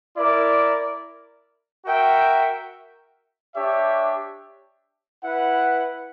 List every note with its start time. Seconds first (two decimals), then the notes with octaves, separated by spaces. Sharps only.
0.17 E4 A#4 D5
1.86 F#4 A#4 E5 G5
3.55 D4 G4 C#5 E5
5.24 E4 B4 F#5